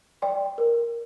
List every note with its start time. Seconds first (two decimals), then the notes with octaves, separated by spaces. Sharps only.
0.22 D5 G5 C6
0.58 A#4